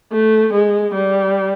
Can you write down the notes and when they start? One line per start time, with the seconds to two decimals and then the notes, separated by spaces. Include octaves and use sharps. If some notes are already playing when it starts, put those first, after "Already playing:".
0.12 A3
0.54 G#3
0.94 G3